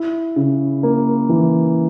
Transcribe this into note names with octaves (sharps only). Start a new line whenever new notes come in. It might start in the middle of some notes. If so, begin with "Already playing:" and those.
Already playing: E4
C#3
A#3
E3